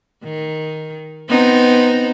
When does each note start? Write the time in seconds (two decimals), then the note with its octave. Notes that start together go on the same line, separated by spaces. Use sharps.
0.23 D#3
1.29 B3 C4 D#4